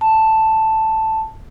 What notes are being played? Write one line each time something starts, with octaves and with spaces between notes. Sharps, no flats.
A5